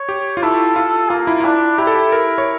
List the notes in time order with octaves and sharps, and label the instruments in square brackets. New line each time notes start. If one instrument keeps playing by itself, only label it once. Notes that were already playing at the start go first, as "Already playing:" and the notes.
Already playing: [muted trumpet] C#5
[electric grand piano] G4
F4
[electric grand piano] E4 [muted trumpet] A4
[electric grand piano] F4
[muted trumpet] A#3 [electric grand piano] F4
[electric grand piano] E4
F4
[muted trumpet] D4 [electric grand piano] E4
[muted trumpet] E4 [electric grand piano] G4
[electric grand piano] A4
G4
A#4
C#5